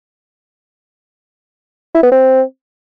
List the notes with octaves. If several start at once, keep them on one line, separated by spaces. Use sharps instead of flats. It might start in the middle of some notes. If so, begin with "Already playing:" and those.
E4
B3
C4